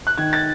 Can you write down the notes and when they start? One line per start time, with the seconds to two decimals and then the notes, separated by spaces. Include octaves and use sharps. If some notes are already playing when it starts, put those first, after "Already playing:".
0.07 F#6
0.18 D#3 G#6
0.33 A6